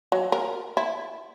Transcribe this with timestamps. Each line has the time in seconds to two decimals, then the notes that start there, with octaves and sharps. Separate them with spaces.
0.12 F#3
0.32 A#4
0.77 E4